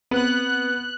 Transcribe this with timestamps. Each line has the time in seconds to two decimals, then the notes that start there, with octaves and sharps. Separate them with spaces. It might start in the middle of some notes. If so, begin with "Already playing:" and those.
0.11 B3 C4 F#6